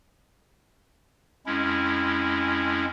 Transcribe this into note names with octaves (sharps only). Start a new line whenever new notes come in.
F2 G#3 C#4 E4